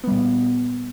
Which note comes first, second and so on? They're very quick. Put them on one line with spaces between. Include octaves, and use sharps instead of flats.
B3 G3 A#2